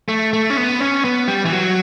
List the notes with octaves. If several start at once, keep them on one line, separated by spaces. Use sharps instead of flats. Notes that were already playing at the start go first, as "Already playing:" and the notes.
A3
A3
C#4
B3
C#4
B3
G3
E3
F#3